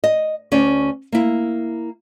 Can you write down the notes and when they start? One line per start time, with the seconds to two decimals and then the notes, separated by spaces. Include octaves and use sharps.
0.04 D#5
0.52 D2 C#4 D5
1.12 A#3 E4